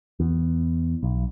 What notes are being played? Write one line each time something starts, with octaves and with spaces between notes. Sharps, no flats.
E2
B1